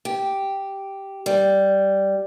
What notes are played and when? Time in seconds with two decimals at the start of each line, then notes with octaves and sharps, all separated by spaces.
0.05 G4
1.26 G3